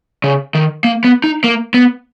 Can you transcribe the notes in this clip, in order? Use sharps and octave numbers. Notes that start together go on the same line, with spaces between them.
C#3
D#3
A#3
B3
D#4
A#3
B3